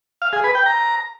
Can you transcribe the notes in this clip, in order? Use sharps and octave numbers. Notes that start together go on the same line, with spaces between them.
F5
G#4
B4
G5
A#5